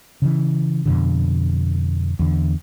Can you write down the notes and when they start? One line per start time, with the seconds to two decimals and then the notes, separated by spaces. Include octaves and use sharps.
0.22 C#3 E3
0.86 F2 B2 D3
2.19 E2 D3